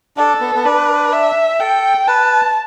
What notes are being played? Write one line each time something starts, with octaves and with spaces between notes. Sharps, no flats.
D4 A4
B3
B3
D4 B4
E5
A4 G5
B4 A5